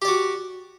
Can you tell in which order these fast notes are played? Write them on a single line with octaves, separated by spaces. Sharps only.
G4 D5 F#4